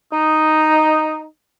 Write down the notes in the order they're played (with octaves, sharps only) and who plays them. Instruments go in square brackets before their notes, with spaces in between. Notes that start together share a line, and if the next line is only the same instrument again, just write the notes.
[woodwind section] D#4